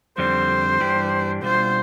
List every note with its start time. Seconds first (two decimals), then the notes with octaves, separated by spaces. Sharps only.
0.18 F2 D3 G3 C4 C5
0.80 G2 E3 G3 D4 G4
1.43 B2 G3 D4 F4 C5